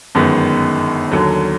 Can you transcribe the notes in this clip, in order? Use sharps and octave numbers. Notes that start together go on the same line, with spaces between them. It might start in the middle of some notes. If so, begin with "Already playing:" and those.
G1 F#2 D#3 G#3 B3
D#2 D3 F#3